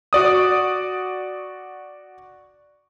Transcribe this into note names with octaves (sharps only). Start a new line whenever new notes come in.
F#4 D5 D#6